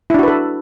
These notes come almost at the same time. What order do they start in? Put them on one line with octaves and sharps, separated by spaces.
E4 D4 F#4 B4 A4